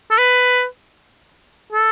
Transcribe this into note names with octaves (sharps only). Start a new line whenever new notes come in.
A4
B4
A4